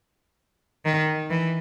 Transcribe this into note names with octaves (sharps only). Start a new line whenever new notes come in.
D#3
E3